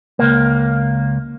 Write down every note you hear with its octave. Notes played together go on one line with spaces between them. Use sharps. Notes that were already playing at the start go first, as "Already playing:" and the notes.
C#2 A#3